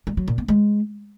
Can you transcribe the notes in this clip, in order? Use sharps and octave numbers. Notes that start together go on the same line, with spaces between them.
G3
F#3
A#2
B3
G#3